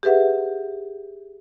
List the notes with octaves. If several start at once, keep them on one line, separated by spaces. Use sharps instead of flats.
G4 G#4 B4 E5 F#5